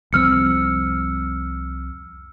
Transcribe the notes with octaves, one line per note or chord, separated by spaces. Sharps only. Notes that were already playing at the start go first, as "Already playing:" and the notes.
C2 F2 C4 E6 F6 C#7